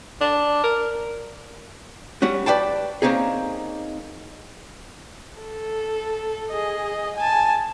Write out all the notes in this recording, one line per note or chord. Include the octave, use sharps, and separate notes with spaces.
D4
A#4
G3 C#4 F#4
B4 D5 G5 A5
A#3 C4 C#4 D#4 G#4
A4
G#4 D#5
G#5 A5